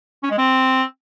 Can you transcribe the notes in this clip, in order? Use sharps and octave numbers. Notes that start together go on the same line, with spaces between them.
C#4
G#3
C4